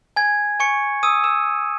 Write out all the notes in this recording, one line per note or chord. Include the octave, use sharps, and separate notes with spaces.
G#5 G#6
G#5 C#6 C#7
D#6 E6 D#7
E6 E7